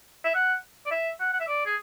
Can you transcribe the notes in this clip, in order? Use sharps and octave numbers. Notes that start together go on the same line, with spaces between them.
E5
F#5
D5
E5
F#5
F#5
E5
D5
G#4